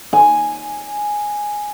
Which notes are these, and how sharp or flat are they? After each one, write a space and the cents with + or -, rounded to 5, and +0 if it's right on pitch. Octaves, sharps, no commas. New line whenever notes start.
G#5 +0